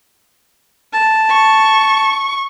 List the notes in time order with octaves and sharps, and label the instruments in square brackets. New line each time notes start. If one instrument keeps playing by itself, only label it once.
[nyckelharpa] A5
[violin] C#6